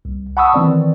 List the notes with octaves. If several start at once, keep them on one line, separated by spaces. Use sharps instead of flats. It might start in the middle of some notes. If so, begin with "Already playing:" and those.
C2
F#5 A5 B5 C#6 D#6 E6
D#3 E3 C4 D5